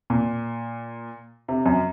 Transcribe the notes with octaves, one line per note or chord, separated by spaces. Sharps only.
A#2
C3
F#2